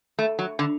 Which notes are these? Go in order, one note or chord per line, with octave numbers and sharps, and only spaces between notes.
A3
F#3
D3